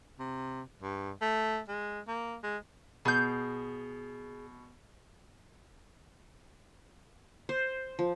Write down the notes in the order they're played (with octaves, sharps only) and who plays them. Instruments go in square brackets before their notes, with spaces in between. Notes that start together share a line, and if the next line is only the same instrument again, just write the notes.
[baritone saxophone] C3
G2
A3
G#3
A#3
G#3
[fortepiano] B2 [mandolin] G#4 G6
[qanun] C5
F3